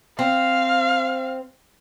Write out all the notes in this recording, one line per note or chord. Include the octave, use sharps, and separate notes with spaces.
C4 F5